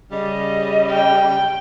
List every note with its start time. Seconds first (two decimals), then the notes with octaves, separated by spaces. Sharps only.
0.12 C#3 G3 D#5
0.90 G5